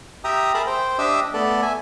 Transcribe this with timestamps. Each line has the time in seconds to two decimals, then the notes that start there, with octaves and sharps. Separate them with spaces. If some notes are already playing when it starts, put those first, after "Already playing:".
0.24 G4 E5 G5 A#5 D#6
0.54 G#4 A#4 E5 A5 B5
0.67 C5 G5
0.99 D4 G4 D#5 E5 D6 E6
1.34 A3 B3 A4 D5
1.62 E5 G#5